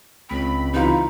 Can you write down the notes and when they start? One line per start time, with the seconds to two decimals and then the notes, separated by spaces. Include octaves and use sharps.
0.29 C#2 C4 B5
0.73 C3 E3 D#4 F4